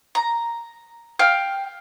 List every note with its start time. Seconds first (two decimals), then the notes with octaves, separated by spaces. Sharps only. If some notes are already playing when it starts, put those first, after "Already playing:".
0.15 A#5
1.19 F5 G5 F6